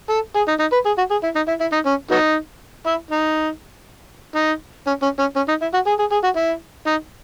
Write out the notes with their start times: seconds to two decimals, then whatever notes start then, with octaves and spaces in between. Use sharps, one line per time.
0.10 A4
0.36 G#4
0.48 D#4
0.60 D#4
0.73 B4
0.86 G#4
0.98 F#4
1.11 G#4
1.23 E4
1.36 D#4
1.48 E4
1.61 E4
1.73 D#4
1.86 C#4
2.11 F#3 B3 D#4
2.86 E4
3.11 D#4
4.35 D#4
4.87 C#4
5.02 C#4
5.19 C#4
5.36 C#4
5.48 D#4
5.62 E4
5.74 F#4
5.87 G#4
5.99 G#4
6.12 G#4
6.24 F#4
6.36 E4
6.87 D#4